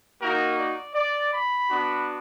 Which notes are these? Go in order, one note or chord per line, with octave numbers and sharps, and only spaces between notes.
A#3 D#4 F#4 A#4
D5
D5
B5
B3 D4 F#4